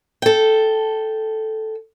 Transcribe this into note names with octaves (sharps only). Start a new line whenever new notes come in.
A4 G5